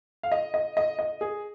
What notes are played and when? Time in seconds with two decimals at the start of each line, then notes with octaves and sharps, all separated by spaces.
0.23 F5
0.32 D#5
0.54 D#5
0.77 D#5
0.99 D#5
1.21 G#4